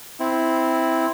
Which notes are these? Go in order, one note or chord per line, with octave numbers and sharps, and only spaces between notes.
C4 E4